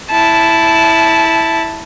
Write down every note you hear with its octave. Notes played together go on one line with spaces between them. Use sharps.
E4 A5